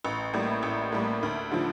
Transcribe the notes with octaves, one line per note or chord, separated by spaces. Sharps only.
A1
A2 G3 A#3
A1
A2 G3 A#3
D2
D3 F3